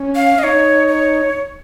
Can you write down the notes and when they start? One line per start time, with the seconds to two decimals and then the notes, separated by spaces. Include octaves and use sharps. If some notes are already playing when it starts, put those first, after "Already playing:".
Already playing: C#4
0.15 F5
0.39 D#5
0.44 D#4 C#5
0.88 C#5